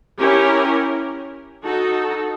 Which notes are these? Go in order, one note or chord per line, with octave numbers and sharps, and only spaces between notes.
C#4 E4 G4 A#4
D#4 F#4 A4